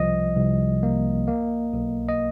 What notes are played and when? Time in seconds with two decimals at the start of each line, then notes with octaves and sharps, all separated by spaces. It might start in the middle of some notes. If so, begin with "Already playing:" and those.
Already playing: C2 F3 D#5
0.36 C2
0.83 A#3
1.28 A#3
1.73 B1
2.08 D#5